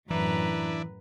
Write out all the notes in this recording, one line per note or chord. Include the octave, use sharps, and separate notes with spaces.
F#2 A2 E3 D4 E4 B4 A#5